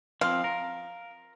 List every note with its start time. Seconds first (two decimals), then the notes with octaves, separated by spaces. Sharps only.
0.21 F3 C4 F5
0.44 A#4